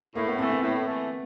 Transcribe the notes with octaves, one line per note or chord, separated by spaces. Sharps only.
A2 A#3
B3
E3 A3 C4
B3
A2
E3 A3